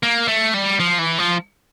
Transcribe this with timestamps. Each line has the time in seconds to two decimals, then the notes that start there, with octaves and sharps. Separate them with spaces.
0.03 A#3
0.28 A3
0.54 G3
0.80 F3
0.99 E3
1.18 F3